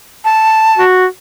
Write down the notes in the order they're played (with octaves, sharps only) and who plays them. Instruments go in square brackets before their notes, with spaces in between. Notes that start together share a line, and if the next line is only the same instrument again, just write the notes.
[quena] A5
[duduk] F#4